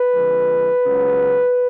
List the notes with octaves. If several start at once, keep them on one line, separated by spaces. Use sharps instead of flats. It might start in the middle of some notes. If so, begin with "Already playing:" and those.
Already playing: B4
F2 D3 F3 G#3
C#2 C#3 F#3